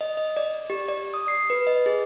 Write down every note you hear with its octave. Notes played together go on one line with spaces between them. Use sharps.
D#5
D#5
D5
G4
D5
D#6
C7
B4
D#5
G#4